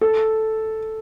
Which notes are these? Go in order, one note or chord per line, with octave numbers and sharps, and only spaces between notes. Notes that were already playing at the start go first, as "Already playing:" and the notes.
A4